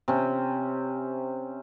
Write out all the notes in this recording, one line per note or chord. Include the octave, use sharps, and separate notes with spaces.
C3 C#4